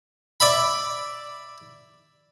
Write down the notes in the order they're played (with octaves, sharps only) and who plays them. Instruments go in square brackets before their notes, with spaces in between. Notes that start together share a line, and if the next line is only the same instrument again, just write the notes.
[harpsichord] D5 E5 B5